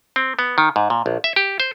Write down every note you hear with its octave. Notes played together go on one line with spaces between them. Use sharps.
C4
B3
D#3
G#2
A#2
A#1
E5
G4
C5